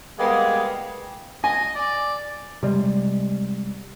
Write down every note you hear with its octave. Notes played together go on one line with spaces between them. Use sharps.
G3 G#3 A#3 B3 G#4
D#5 G#5
D5
C3 G3 G#3